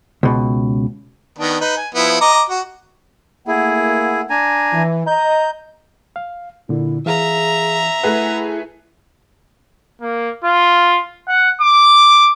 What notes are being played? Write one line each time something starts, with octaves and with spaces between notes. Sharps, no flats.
C#2 B2
D#3 B3 D4
D#4 B4
G#5
F3 B3 E4
D#5 A#5 D6
F#4
A3 A#3 E4 G#4 F#5
D4 G#5 A#5
E3
D#5 A#5 G6
F5
A#2 D3 E4
E3 G#4 E5 F5 A#5
A3 E4 G#4 B4 F#5 F#6
A#3
F4
F#5
D6